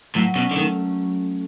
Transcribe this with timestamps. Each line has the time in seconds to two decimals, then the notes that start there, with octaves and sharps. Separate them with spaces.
0.15 A2 F#3
0.35 B2 C#4
0.51 D3
0.56 D#3 A3